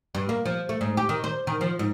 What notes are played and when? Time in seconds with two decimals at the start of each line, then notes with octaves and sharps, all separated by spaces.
0.15 G2
0.29 A#3
0.45 F3
0.69 A3
0.81 G#2
0.97 G4
1.09 D#3
1.24 C5
1.47 D#3
1.61 F3
1.79 G#2